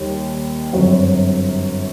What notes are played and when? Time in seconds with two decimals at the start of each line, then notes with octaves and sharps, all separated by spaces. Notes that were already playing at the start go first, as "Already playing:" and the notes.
Already playing: D#2 D#3 G3
0.73 G1 F#2 F#3 C4 F#4